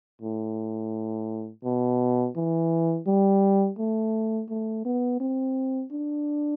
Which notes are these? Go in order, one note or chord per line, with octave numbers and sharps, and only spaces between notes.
A2
B2
E3
G3
A3
A3
B3
C4
D4